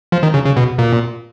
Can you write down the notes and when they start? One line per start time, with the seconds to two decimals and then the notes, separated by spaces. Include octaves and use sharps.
0.12 F3
0.23 D#3
0.34 C#3
0.46 C#3
0.56 B2
0.78 A#2